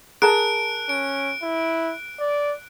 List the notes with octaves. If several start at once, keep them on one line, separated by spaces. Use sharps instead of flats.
G#4 A#4 A5 F#6 D7
C#4 D7
E4
D5